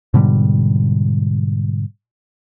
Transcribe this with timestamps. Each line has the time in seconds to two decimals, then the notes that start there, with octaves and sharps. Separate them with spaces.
0.14 G#2 B2 D3 G3